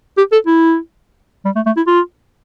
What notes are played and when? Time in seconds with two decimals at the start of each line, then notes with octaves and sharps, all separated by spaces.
0.18 G4
0.32 A4
0.47 E4
1.45 G3
1.56 A3
1.66 A3
1.77 E4
1.87 F4